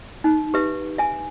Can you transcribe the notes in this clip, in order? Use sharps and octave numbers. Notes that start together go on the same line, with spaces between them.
D#4
G4 B4 E5
E5 G#5